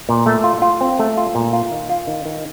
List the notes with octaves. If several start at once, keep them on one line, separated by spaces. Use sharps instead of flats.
A#2
A3
F4
F4
C4
A3
F4
A#2
F4
D#3
F4
D#3
D#3